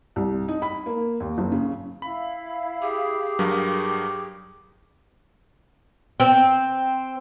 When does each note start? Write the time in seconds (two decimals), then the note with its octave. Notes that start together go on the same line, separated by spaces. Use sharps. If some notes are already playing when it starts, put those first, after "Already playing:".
0.16 C2
0.48 D#4
0.62 B5
0.86 A#3
1.20 D#2
1.38 F#1
1.52 C#3
2.02 E4 F5 B5
2.82 G4 G#4
3.39 G2 F#3 A#4
6.20 C4